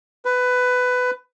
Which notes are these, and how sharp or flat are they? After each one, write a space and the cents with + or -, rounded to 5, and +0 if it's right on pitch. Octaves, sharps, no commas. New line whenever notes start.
B4 +15